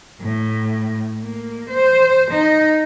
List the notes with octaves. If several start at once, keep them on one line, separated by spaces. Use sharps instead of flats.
A2
A#3
C5
D#4